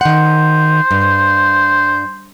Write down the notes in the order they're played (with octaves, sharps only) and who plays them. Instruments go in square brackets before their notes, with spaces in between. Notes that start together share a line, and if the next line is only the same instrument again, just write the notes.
[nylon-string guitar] D#3 F#5 [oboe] C5
[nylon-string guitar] G2